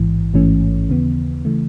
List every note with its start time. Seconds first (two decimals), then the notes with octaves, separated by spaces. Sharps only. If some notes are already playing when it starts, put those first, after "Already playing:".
Already playing: A1 G#2 E3
0.34 A1 G#2 E3 A3 C#4
0.89 D#2 C#3 E3 B3
1.45 C#3 E3 A3